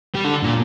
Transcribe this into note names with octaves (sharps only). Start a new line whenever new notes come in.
G3
D3
A#2